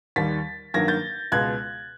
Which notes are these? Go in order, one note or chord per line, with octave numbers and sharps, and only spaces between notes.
D#2 D#3 G3 A6 B6
G2 D#3 F#3 A#3 G#6 A#6
G6 A6
C#2 B2 G#3 F#6 G#6